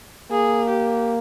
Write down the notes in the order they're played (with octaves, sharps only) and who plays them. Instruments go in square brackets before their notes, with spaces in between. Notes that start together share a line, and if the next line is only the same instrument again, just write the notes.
[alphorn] A#3 [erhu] G#4
[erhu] G4